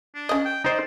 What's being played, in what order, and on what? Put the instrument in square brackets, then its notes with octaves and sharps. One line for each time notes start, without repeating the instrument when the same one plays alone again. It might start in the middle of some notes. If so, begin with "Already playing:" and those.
[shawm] D4
[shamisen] C#4 D#5
[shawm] G5
[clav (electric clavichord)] D#4 C5 [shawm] D5